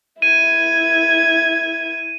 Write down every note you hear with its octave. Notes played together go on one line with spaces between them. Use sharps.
E4 E5 G#6 D#7